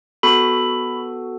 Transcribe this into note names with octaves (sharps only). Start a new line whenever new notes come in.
B3 F#4 A4 B5